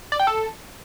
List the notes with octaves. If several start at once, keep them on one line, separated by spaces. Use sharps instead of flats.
D5
G5
A4